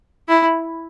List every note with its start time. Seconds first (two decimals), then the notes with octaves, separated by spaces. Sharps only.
0.28 E4